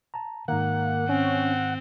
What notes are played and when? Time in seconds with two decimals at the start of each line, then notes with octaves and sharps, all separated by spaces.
0.14 A5 A#5
0.48 G#2 D#3 A#3 F#5
1.09 C4 C#4